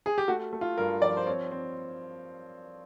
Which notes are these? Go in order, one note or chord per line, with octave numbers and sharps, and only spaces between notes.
G#4
G4
A3 F#4
A3
F4
G2 A#4
F3 D5
C5
C4 C#5
C4